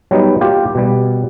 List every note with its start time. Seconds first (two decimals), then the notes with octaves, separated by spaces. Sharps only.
0.11 F#3 G3 B3 D#4
0.41 A#3 F4 G4
0.75 B2 G3